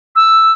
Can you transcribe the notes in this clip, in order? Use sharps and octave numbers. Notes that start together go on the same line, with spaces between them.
E6